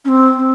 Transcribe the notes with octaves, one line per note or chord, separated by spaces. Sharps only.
C#4
C4
C4